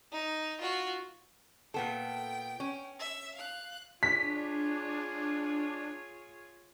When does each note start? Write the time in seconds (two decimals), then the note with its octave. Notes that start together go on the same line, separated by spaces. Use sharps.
0.12 D#4
0.60 F4 F#4
1.74 A#2 B3 A4 G5
2.60 C#4
3.00 E5
3.35 F5 F#6
4.03 D4 F4 G#4 C#5 B6